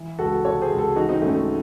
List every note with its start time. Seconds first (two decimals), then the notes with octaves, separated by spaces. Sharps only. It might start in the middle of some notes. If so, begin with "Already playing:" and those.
Already playing: E3
0.19 C#2 F#4 A4
0.45 C3 A4 C#5
0.62 G#4 C5
0.70 C#2
0.78 F#4 A4
0.96 E3 D#4 F#4
1.09 C4 D#4
1.22 G#1 A3 C#4
1.35 A3